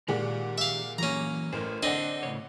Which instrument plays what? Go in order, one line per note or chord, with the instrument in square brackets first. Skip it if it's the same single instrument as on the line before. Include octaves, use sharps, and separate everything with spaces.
[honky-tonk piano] A#2 G#3 F#5 [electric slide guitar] D#3 G4 D5
[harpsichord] E5 F5
[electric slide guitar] E3 F#3 A#3 [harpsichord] C#4 A#5
[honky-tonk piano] A1 [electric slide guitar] A3 A#4 C5
[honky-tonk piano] D3 D5 F#5 [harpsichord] C4 D#5 [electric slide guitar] D4 C5
[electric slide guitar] A2 C#3 C#5